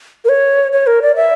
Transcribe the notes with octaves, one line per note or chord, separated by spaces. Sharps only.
A#4
C#5
C#5
A#4
D5
E5